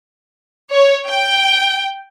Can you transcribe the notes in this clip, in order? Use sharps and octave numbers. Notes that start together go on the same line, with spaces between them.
C#5
G5